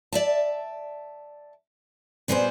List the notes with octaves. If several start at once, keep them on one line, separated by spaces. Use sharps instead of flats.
D5 E5 A5
A#2 G3 B3 G#4 A#4 C5